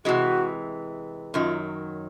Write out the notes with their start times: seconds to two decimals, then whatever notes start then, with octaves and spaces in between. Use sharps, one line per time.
0.05 C3 E3 G#3 F#4
1.34 F#2 D#3 F#3 F4